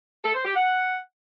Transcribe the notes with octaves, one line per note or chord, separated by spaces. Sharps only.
A4
C5
G4
F#5